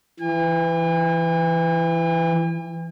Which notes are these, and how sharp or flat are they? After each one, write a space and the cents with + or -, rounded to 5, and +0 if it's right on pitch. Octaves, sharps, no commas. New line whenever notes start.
E3 +20 G#5 -45